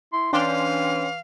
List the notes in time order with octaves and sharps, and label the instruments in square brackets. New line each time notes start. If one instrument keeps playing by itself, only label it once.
[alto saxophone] E4 [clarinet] C6
[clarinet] E3 [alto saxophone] C#4 [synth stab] D4 G5 C6 [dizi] F5